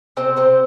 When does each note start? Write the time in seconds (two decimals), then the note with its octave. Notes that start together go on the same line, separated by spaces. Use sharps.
0.17 C3 C4 C5
0.36 C3 C4 C5